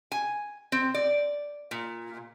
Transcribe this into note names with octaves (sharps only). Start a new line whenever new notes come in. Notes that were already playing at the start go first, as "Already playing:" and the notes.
G#5
C4
D5
A#2